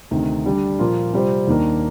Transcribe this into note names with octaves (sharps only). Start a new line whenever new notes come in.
D2 C3 D#3
D3 G3 D4
A#2 F3 A#3 F4
C3 G3 C4 F4 C5
D#2 D#3 A#3 D4